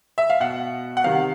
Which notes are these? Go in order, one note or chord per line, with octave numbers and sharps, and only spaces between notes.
E5
F5
B2 F#5
F#5
C3 D#3 F5